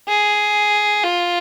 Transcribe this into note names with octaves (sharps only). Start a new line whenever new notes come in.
G#4
F4